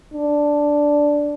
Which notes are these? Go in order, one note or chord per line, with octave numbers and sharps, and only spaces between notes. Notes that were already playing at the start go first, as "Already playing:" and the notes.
D4